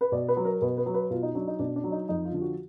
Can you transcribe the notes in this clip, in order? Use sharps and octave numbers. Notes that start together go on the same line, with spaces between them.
B4
B2 D5
B4
F#3
A#4
B2 B4
B4
F#3
B4
B2 F4
D#4
F#3 D4
D#4
B2 D4
D4
F#3
D#4
F2 D#4
F4
D3 F3
F#4